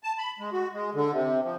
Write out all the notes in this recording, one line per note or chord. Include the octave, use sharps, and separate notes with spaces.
A5
B5
G#3
F#4
G#3
D3
C3
F3